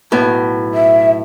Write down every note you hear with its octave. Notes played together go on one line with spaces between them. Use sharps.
B1 A2 B3
E5